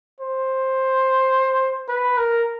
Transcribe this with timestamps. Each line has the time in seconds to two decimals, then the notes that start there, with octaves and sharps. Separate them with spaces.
0.20 C5
1.89 B4
2.17 A#4